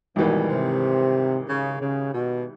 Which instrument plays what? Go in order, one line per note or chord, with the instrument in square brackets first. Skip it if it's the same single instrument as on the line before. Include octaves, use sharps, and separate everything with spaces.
[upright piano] G#1 G#2 E3 G3 A#3 [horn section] B2
[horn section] C3
C#3
C#3
B2